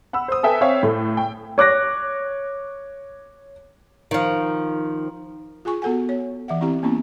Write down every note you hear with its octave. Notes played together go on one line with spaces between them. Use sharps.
F#5 B5 E6
C5 D#6
A4 B4 E5 G5 G#5
C4 C#5 E5 F5
A2 A3
G5
C#5 D6 F#6 A#6
D#3 F3
F4 G#4 G#5 C#6
B3 F#4 A4 F#5 G#5
C#5
E3 E5 F#5
C4 E4 G4 A#5
A#3 B3 C#4 E4